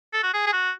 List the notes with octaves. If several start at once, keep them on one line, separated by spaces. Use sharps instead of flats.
A4
F#4
G#4
G#4
F#4